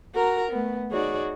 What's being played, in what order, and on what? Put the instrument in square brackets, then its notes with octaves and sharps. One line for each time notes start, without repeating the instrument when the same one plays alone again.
[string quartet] F#4 A#4 A#5
A3 B3
D#4 F#4 G#4 C#5 D5